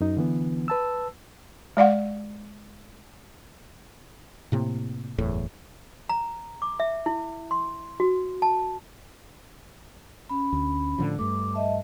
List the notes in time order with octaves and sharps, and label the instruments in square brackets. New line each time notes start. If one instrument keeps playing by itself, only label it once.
[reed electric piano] F#2 D#4
D3 E3 B3
B4 A5 E6
[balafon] G#3 D5 F5 F#5
[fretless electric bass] A2 C3 A#3
F#1 E2 A2
[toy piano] A#5
D6
E5
E4
C6
F#4
A5
[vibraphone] C#4 B5
[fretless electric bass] D2
A2 D3 F3
[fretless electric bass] G2 A3 [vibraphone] D6
[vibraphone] D#5 E5 A5